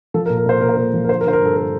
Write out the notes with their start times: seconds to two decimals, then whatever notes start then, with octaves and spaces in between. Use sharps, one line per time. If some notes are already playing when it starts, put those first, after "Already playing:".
0.14 F3 A4
0.26 A#4
0.30 A#2
0.37 A#4
0.46 A#2 C5
0.61 A#2 A#4
0.69 C5
0.77 A#2 A#4
0.94 F3
1.04 A#4
1.09 D3 C5
1.21 A#4
1.25 D3 C5
1.33 A#4
1.41 G2 A4
1.57 A#4